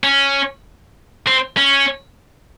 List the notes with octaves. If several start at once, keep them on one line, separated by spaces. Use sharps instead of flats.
C#4
C4
C#4